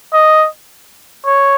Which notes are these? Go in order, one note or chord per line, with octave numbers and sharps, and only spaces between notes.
D#5
C#5